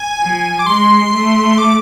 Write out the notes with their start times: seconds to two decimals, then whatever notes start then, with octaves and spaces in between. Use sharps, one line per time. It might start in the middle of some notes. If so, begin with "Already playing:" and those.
Already playing: G#5
0.21 F3
0.59 D6
0.66 G#3 C6
1.13 A3
1.58 D6